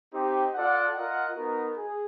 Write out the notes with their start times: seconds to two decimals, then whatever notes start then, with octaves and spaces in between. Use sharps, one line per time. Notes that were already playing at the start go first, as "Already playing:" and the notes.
0.13 C4 D#4 G4
0.54 F4 A4 D5 F#5
0.94 F4 A#4 D#5 F#5
1.36 B3 D#4 F#4 A#4
1.76 G#4